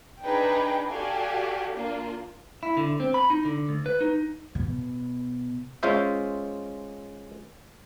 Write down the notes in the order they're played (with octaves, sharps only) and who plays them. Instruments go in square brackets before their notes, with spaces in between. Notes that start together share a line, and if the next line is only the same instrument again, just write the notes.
[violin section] D4 D#4 G#4 B4 G5
F#4 G4 A4 D5 F5 G#5
A#3 D4 F4
[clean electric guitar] E4
D3
C4
B5
D#4
D3
D2
B4
D#4
[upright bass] B2
[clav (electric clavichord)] G#3 C#4 F4 C5 E5